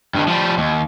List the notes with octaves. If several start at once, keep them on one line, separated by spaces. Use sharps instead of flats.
G2 D#3
F3 G3
D#2